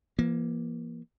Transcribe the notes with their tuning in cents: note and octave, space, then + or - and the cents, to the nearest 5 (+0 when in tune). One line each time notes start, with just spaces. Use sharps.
E3 +45 A#3 +20